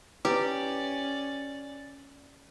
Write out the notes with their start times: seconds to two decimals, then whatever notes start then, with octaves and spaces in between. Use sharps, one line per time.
0.25 C#4 E4 G4 B4 D5 D6